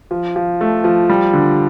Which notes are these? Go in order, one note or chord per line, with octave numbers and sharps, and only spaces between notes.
F3
F3
A3
F3
G3
D3